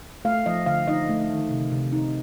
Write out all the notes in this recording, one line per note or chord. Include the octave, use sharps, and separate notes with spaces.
A3 F5
F3 D#5
D3 F5
D#4 D#5
A3
D#3
C3
C3
D#4